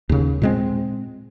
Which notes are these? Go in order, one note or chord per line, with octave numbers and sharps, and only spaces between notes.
D#2 C#3
A#2 G#3 C4